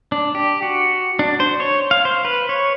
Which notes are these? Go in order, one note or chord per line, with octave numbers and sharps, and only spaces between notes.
D4
G4
F#4
D4
C5
C#5
F5
C5
B4
C#5